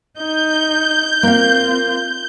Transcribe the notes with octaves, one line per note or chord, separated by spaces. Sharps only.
D#4 G6
A#3 C4 F4 F5